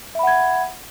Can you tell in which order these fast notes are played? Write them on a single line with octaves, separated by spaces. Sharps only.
E5 B5 F#5 G#6